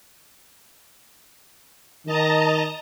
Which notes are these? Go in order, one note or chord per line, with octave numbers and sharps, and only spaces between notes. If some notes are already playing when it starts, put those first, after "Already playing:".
D#3 D#5 A5 A#5